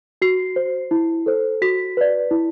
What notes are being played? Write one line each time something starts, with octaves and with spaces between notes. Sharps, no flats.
F#4 C7
C5
E4
A4 C5
F#4 B6
B4 D5
E4